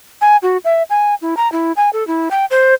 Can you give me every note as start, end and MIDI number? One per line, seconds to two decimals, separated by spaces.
0.21 0.37 80
0.43 0.57 66
0.65 0.83 76
0.90 1.15 80
1.22 1.34 64
1.37 1.50 82
1.52 1.72 64
1.77 1.90 80
1.93 2.06 69
2.07 2.29 64
2.31 2.45 79
2.51 2.74 72